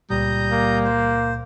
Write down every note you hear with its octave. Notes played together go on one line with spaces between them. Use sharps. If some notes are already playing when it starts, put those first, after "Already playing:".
C#2 A#2 G3 A#5 D#6 G6
A#3
C5